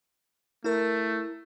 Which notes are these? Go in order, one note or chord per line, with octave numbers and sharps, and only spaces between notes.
A3 E4 A#4